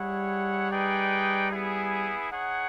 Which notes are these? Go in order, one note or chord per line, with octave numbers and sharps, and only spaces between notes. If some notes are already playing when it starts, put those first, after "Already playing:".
Already playing: G3 E4 G#4 C#5 F#5
D#4 G#4 B4 D5 G5
B3 E4 G#4
D#4 G#4 C#5 F#5